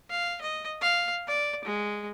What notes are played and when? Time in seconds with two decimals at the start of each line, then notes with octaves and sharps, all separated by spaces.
0.10 F5
0.41 D#5
0.82 F5
1.28 D5
1.65 G#3